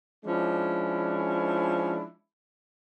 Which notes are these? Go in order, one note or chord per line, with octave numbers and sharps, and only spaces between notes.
F3 G#3 C#4 D4 E4